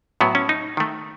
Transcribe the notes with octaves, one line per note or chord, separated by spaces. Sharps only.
A2 F#3 B3
C#4
D#4
D#3 A3